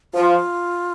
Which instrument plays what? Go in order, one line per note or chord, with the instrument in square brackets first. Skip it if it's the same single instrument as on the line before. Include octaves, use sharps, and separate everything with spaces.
[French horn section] F3 [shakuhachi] F4